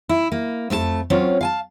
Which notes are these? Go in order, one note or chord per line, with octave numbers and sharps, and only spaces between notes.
E4
A#3
F2 A3 G#4 A5
F#3 C4 C#4 F4
F5 G#5 A5